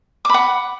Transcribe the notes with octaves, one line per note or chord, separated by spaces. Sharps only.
F#5 B5 D6